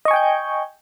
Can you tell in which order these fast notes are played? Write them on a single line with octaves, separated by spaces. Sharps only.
D#5 C#6 G#5 G5 G6